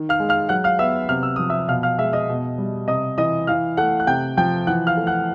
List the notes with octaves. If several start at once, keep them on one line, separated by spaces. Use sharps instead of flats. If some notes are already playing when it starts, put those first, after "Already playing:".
Already playing: D#3
F5 F6
G#3
F5 F6
F#3 F#5 F#6
F5 F6
B3 E5 E6
C3 F6
E6
F3 D#6
E5 E6
B2 F5 F6
F5 F6
G#3 E5 E6
D#5 D#6
B2
G3
C3 D#5 D#6
E3 D#5 D#6
E3 F5 F6
A3 F#5 F#6
F#6
C3 G5 G6
F3 G5 G6
E3 F#5 F#6
F5 F6
A3
F#5 F#6